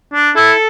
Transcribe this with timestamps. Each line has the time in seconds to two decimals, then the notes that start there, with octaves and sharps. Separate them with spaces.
0.14 D4
0.36 E4 A4